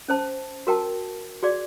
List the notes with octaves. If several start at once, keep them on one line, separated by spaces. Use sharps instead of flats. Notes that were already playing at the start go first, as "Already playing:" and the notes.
C#4 C5 A5
F#4 A#4 G5 A5
F#4 G#4 D5